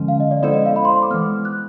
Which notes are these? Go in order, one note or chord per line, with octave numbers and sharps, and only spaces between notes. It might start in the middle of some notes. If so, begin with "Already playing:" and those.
Already playing: D3 F3 G#3 C#4
F5
D#5
D5
G#3 B3 E4 A4 C5 D5
D#5
F5
B5
C6
D6
E3 G#3 B3 F6
F#6